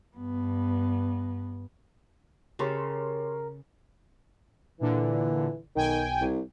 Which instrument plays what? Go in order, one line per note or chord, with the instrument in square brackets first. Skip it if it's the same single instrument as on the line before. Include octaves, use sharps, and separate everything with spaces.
[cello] G2 B3
[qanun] C#3 A4 [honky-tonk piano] G4 C#5 C6 [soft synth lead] A#4
[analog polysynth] A#2 D3 [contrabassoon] E3
[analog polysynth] B1 G5 G#5 [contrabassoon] D#3
[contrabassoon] C2